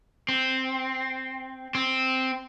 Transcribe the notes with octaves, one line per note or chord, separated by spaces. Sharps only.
C4
C4